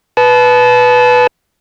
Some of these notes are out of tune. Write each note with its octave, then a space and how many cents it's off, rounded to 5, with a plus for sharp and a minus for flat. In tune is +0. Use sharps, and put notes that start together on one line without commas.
B4 +0 A5 -25